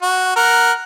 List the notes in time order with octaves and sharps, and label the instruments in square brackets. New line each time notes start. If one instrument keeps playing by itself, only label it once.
[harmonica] F#4
A#4 F#5